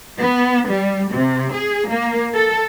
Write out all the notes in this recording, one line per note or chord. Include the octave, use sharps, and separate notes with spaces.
B3
G3
C3
G#4
A#3
A4